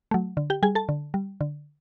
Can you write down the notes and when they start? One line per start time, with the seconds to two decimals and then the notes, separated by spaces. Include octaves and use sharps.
0.11 F#3 A3
0.37 D3
0.50 G4 G5
0.63 G3 G#4 G#5
0.75 A4 A5
0.89 D3
1.14 G3
1.41 D3